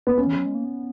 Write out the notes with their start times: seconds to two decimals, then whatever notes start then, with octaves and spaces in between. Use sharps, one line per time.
0.07 B3
0.17 A#3 C#4
0.27 E3
0.36 F#3
0.46 G#3
0.55 A#3
0.65 B3